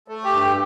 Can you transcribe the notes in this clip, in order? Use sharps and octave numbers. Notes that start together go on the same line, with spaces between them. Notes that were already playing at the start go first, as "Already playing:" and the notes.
A3
G4
G2